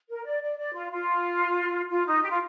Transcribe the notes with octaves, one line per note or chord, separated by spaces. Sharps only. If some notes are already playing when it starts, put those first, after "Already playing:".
A#4
D5
D5
D5
F4
F4
F4
D#4
G4
F4